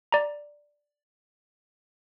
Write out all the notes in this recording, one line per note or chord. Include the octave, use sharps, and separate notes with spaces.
D5 A#5